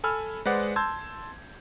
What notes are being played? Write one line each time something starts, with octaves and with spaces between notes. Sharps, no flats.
A4 G#5 B5 E6 F6
G#3 B4 C5 D5 F#5
A5 C6 E6 G6 G#6